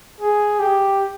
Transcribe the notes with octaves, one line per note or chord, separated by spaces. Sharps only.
G#4
G4